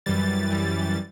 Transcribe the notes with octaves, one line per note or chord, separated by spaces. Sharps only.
F#2 E3 G3 A6
F#2 E3 G3
A6